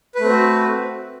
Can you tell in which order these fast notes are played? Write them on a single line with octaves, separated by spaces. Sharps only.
B4 A3 C4 F#4